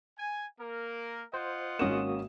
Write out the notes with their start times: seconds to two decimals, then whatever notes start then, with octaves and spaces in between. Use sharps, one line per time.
0.18 G#5
0.60 A#3 A#4
1.34 F4 C5 D#5 F#5
1.79 G#1 A#3 C#4 F#4 D#6 E7